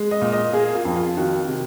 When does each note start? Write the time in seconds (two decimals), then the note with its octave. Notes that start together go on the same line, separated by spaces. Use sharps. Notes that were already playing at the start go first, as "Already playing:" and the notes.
Already playing: G#3
0.11 D#5
0.22 A#2
0.32 D#5
0.53 A#3 G#4
0.75 F4
0.85 F2
0.96 F4
1.17 D#3 F#4
1.48 C3